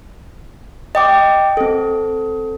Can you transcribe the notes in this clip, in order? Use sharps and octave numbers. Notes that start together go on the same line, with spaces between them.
D#5 G5 D6
C4 A4